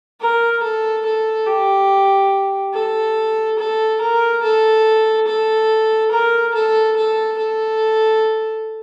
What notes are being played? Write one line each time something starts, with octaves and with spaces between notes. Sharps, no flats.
A#4
A4
A4
G4
A4
A4
A#4
A4
A4
A#4
A4
A4
A4